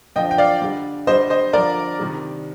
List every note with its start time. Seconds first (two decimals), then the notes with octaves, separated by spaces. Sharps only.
0.16 D3 F3 D#5 G5
0.31 G5
0.38 D5 F5
0.62 D3 G3
1.07 D3 G3 C5 D#5
1.30 C5 D#5
1.53 D3 F3 A#4 D5
1.99 C3 D#3 G3